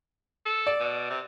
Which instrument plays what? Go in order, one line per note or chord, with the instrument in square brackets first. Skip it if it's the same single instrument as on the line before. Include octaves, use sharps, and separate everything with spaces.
[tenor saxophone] A4
[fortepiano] D5
[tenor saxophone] B2
C3